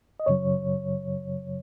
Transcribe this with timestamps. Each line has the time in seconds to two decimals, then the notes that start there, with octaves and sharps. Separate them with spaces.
0.20 D#5
0.26 F#2 C#3 F#3 C#5